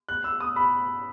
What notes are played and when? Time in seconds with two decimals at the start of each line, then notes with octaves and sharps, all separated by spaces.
0.09 F#6
0.24 E6
0.40 D#6
0.56 B5